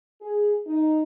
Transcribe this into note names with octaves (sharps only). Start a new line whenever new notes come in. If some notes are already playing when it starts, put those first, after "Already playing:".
G#4
D#4